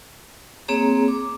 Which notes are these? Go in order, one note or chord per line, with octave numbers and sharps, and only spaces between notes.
A#3 C4 G#4 C#5 A#5
D6